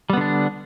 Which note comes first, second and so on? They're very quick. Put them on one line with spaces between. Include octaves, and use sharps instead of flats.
G3 B3 D3 D4